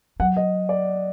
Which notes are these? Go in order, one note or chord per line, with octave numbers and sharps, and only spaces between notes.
F#3 F#5
D#5
D5